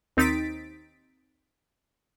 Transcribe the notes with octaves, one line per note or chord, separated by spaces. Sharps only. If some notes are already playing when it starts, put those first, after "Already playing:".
D#2 C4 D#4 A6 B6 D7